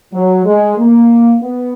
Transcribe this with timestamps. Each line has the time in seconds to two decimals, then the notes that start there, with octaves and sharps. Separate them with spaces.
0.13 F#3
0.46 G#3
0.78 A#3
1.42 B3